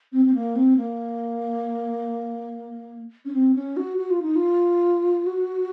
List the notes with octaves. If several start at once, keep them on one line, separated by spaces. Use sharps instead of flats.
C4
C4
A#3
C4
A#3
C#4
C4
C#4
F#4
F#4
F4
D#4
F4
F#4